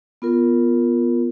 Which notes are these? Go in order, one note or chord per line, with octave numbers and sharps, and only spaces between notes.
B3 F4 A#4